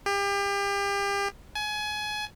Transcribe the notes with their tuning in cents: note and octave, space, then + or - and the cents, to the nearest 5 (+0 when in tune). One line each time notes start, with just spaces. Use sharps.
G4 +35
G#5 +25